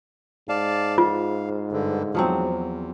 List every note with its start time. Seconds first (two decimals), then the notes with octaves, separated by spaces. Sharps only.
0.49 G#2 D5 F5 A5
0.98 F4 F5
1.72 G2 D3
2.15 E2 F3 F#3 C4